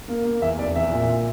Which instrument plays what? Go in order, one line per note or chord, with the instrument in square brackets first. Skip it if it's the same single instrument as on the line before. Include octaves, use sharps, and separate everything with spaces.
[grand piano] A#3
A#3
E2 E5
F1 D5
E2 E5
A#2
A#2